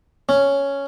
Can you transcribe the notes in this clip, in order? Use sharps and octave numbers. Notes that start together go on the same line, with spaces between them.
C#4